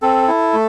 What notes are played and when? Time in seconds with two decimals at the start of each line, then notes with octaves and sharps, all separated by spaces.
0.02 C4 A4
0.28 E4
0.53 A3